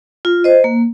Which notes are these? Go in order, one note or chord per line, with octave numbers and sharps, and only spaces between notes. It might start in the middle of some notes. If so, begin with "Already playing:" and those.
F4
C5 D#5
A#3